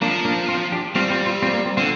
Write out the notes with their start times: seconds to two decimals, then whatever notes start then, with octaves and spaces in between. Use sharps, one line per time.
0.02 F3 A#3 D4
0.25 A#3 D4
0.49 C4 F4
0.72 D4 G4
0.95 G3 C4 F4
1.10 C4 F4
1.26 C4 F4
1.42 C4 F4
1.53 A#3
1.66 C4
1.77 D3 C4 F4